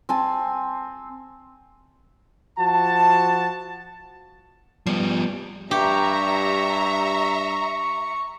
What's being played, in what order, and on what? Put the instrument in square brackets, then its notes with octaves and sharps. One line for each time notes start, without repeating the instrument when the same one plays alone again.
[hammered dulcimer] C4 G#5 A5
[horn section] F3 F#4 A5
[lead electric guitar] F3 B3 [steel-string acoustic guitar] G3
[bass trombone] G2 [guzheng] G4 [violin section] E5 A#5 [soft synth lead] C#6